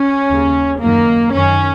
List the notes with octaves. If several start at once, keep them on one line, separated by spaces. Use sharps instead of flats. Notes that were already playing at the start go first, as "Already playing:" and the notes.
Already playing: C#4
D#2 C#3
F#2 D#3 A#3
F#2 D#3 C#4